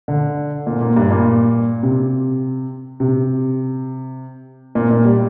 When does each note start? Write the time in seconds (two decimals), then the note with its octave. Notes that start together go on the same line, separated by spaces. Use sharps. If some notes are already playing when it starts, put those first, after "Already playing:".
0.08 D3
0.67 A#2
0.81 A#2
0.96 G2
1.11 A#2
1.83 C3
3.00 C3
4.75 A#2
4.91 A#2
5.05 G3